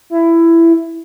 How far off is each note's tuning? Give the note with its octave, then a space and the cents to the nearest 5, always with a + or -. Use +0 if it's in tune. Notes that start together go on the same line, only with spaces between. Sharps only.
E4 +15